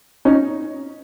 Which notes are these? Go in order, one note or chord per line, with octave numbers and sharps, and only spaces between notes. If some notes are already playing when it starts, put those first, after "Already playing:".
C#4 D#4